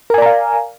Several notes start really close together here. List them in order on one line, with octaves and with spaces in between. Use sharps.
A#4 G#5 D5 A#5 F5